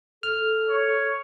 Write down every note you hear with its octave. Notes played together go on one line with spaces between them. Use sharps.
A4 F6
C#5